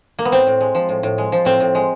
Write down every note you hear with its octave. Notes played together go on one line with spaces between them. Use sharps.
A#3
B3
A2 C4
A2
G#3
F3
A2
A2
G#3
F3
A2 C4
A2
G#3